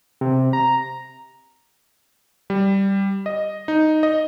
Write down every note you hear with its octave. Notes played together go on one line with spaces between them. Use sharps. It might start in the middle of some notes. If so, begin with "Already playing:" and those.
C3
A#5
G3
D#5
D#4
D#5